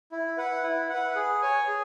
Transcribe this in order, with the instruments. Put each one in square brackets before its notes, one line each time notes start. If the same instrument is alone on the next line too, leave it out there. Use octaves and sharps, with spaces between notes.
[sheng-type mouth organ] E4
B4 F#5
E4
B4 F#5
G#4
C#5 G#5
G#4